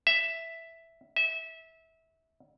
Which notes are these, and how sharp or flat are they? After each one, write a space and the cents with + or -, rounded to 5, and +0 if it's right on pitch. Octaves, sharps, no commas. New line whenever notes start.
E5 +0
E5 -25